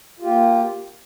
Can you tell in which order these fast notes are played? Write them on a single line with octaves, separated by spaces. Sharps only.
F4 G4 A#3